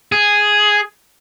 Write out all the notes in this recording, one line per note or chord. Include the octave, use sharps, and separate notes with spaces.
G#4